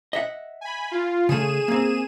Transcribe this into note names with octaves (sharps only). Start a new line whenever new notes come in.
D#5 E5 F#5
G#5 B5
F4
C#3 A3 G#4 D#7 E7
A#3 C4